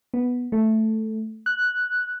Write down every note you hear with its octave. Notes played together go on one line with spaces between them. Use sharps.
B3
A3
F#6